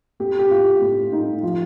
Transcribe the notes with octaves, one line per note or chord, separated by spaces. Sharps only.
A3 G4
G4
A2 F4
A2
A3 D#4
F3 F4